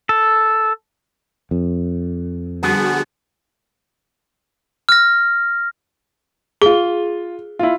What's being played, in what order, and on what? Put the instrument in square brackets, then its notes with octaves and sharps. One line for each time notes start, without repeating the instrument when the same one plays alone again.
[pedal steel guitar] A4
[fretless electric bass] F2
[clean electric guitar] D3 F3 B3 [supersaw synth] G3 F#4 G#4
[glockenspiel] F6 A#6
[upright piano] F4 G7 [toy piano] G#4
[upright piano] E4 F4